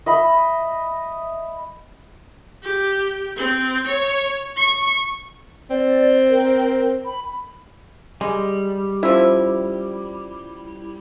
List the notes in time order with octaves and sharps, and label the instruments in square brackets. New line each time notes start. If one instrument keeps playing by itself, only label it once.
[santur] D#5 E5 B5
[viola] G4
C4
C#5
C#6
[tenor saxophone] C4 [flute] D5
[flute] A#4
B5
[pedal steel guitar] G3 [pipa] G#3
[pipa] F3 E5 [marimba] C#4 F4 C5 [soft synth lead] E4